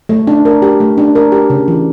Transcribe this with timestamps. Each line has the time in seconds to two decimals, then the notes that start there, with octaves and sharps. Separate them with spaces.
0.09 A3
0.27 D4
0.45 A#4
0.62 G4
0.80 A3
0.98 D4
1.15 A#4
1.32 G4
1.50 C#3
1.68 E3